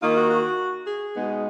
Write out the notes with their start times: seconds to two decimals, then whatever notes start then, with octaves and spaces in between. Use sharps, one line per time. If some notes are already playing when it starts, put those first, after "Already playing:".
0.01 D#3 A#3 D#4 F4
0.16 F#4
0.30 F#4
0.86 G#4
1.15 B2 G#3 B3 D#4